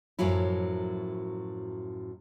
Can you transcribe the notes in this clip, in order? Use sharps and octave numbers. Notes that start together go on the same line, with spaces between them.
F#2 A2 F3 F#3 E4